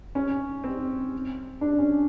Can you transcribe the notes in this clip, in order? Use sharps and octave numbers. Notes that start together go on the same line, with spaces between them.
C#4
C4
D4
C#4